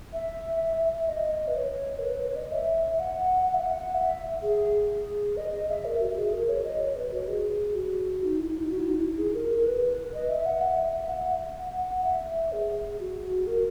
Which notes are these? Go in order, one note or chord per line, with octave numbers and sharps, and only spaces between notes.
E5
E5
E5
E5
D#5
B4
C#5
A#4
B4
C#5
D#5
E5
E5
F#5
F#5
E5
F#5
E5
G#4
D#5
D#5
E5
A#4
F#4
G#4
A#4
C#5
D#5
C#5
B4
F#4
G#4
F#4
D#4
E4
D#4
F#4
E4
D#4
E4
G#4
A#4
A#4
B4
D#5
E5
F#5
E5
F#5
F#5
F#5
E5
G#4
F#4
A#4